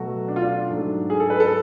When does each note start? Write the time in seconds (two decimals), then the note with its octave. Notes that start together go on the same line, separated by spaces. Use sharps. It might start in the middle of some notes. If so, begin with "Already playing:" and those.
Already playing: B2 F#3 A3 F#4
0.28 D4
0.36 F4
0.43 D4
0.69 G#2 F#3 A3
1.10 G#4
1.20 A4
1.30 B4
1.40 A4